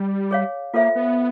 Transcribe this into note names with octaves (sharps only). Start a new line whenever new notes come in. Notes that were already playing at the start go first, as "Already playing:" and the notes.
Already playing: G3
G#4 C#5 F5
A#3 F4 A4 C5 E5
B3